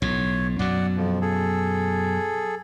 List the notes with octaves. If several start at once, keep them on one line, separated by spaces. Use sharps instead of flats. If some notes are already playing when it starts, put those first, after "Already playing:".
B1 A2 C#5
F#2 B2 F#3 D5 F#5
F2 F3
G#4 A4